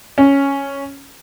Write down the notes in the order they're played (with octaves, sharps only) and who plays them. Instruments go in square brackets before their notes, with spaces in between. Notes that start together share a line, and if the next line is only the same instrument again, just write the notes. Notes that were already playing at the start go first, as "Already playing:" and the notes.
[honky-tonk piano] C#4